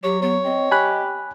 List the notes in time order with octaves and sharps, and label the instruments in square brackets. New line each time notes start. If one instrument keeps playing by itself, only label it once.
[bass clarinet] F#3 [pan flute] G4 [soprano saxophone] C#5
[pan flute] B3 [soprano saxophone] C#5
[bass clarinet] C4 [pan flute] D#5
[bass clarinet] G4 [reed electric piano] G#5 B5 F#6